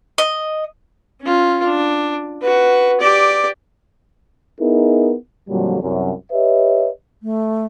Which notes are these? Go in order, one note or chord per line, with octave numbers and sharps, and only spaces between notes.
D#5
C#4 F4
D4
F#4 B4
G4 D5
B3 D#4 E4 G#4 A#4
F2 A#2 D3 F#3 G3
C2 F#2 C3
G4 B4 C#5 D#5 E5
A3